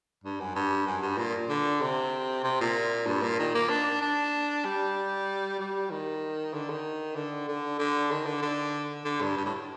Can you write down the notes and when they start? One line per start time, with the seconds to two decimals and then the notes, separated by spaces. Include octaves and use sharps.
0.24 G2
0.40 F#2
0.56 G2
0.87 F#2
1.03 G2
1.18 A#2
1.49 D3
1.82 C3
2.44 C3
2.61 A#2
3.07 G2
3.22 A#2
3.39 D#3
3.55 A#3
3.70 D4
4.02 D4
4.65 G3
5.59 G3
5.91 D#3
6.54 D3
6.70 D#3
7.16 D3
7.48 D3
7.79 D3
8.11 D#3
8.26 D3
8.42 D3
9.05 D3
9.22 G2
9.37 G2
9.45 A2